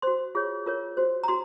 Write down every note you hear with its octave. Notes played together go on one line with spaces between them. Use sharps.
F#4 C5 C6
F4 G#4 C#5
F4 A#4 C#5
F#4 C5
A#5
F#4 C6